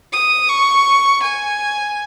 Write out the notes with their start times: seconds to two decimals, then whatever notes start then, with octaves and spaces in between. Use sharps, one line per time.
0.13 D#6
0.49 C#6
1.22 G#5